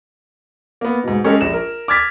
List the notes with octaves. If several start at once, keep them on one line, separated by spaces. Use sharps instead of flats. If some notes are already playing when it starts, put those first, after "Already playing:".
A#3 B3
G#2 B2
G#3 C#4 G4 A4 A#4
A#1 E7
A#4
D6 F6 G#6 A6 B6